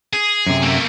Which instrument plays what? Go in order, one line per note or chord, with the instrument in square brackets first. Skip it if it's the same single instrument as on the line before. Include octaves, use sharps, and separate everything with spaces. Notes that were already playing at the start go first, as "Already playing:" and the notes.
[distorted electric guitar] G#4
[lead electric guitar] F#2 C3
[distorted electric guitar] A3 A#3